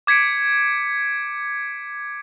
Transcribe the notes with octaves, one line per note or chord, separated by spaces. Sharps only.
D6 G#6 B6 C#7 D7